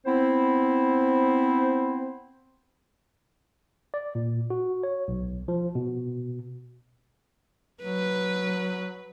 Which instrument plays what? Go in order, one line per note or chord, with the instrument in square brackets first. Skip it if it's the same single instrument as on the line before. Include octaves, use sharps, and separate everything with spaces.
[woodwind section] B3 C4 E4 C5
[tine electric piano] D5
A#2
F#4
C#5
B1
F3
B2
[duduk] F#3 [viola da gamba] B4